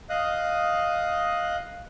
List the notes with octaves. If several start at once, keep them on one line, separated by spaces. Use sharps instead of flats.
D#5 F5 D#6 F#6